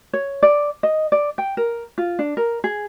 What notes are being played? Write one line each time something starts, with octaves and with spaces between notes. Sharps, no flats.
C#5
D5
D#5
D5
G5
A#4
F4
D4
A#4
G#4